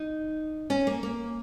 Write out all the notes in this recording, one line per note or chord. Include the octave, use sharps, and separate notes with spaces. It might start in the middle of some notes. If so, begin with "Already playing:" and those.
Already playing: D#4
C#4
A#3
A#3